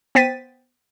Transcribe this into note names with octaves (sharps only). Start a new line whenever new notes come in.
B3 C5 G5 A6 B6 D#7